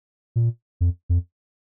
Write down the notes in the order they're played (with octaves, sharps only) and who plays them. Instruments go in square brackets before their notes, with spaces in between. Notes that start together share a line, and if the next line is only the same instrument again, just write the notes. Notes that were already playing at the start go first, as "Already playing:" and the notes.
[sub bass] A#2
F2
F2